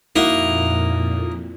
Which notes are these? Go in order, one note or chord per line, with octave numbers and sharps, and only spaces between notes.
F2 A#2 A#3 D#4 E4 F#4